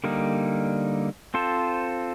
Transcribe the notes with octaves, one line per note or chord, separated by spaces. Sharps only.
D3 G3 A#3 D#4
C4 F4 A4 C5